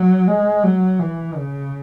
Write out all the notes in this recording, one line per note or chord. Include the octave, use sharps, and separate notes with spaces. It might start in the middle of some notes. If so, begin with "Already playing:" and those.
Already playing: F#3
G#3
F#3
E3
C#3